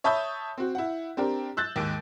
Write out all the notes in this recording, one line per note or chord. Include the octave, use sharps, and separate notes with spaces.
C#5 E5 A5 B5 D#6 G6
C4 F#4
E4 F#5
C4 D4 G4 A#4
E6 F#6 G6 A6
D#2 G#2 D7